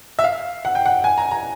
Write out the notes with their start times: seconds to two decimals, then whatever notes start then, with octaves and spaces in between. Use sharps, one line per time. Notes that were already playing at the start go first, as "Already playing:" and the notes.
0.19 E5
0.24 F5
0.65 F#5
0.75 G5
0.86 F#5
1.04 G#5
1.18 A#5
1.31 A#5